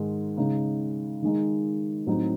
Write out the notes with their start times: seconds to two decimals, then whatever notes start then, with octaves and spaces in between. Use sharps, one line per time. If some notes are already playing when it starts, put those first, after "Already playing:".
Already playing: G#2 D#3 G#3
0.37 C#3 G#3 D#4
1.22 D#3 G#3 D#4
2.07 A2 F#3 C4 D#4